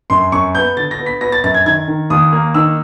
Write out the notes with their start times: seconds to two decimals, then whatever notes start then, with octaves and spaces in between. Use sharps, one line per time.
0.10 F#2 C6
0.32 F#2 C#6
0.55 B3 G6
0.77 D3 A6
0.91 A#6
0.99 B3
1.06 B6
1.21 B3 A#6
1.32 A6
1.44 F#2 A6
1.54 G#6
1.65 D#3 G#6
1.88 D#3
2.10 D#2 D#6
2.32 A#3
2.54 D#3 E6